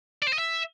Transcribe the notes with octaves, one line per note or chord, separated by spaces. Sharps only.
D5
C5
D#5
E5